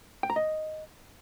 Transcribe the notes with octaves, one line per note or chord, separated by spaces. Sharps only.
G5
A#5
D#5